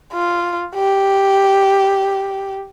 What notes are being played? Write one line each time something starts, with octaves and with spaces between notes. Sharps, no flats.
F4
G4